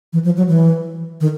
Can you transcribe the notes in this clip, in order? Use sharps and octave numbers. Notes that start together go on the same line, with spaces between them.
E3
F3
F#3
E3
D#3